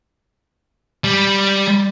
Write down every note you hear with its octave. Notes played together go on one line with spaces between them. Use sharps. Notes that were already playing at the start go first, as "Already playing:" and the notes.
G3